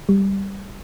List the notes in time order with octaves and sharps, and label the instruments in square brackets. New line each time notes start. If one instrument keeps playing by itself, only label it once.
[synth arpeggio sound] G3